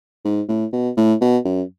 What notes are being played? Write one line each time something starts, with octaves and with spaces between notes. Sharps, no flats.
G#2
A2
B2
A2
B2
F#2